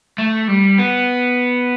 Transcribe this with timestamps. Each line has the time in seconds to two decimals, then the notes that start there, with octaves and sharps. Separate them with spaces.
0.18 A3
0.48 G3
0.78 B3